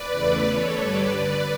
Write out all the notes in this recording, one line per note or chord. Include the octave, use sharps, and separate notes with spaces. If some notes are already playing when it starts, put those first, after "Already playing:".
Already playing: B4 D5
E2 C#3 E3 A3
A4 C#5
G2 D3 G3 B4 D5
B4 D5